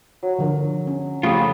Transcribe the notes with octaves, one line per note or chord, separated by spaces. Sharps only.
F#3
D3 F3 A#4
C#4
F2 C#3 A3 F4 G4 B5 C#6 D#6